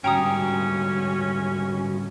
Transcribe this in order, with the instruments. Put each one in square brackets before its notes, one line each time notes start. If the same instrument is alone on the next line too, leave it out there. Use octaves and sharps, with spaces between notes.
[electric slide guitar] G#2 D3 G3 [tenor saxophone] C#4 [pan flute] F#4 [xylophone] G5 A#5 D#6